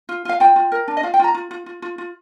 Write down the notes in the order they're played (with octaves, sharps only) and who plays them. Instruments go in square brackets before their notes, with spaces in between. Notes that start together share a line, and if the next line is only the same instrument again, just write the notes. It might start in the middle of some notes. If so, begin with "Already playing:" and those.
[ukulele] F4
F4 F5
F4 G5
F4
A#4
D4
D#5
F4 F5
G5
F4 A#5
F4
F4
F4
F4
F4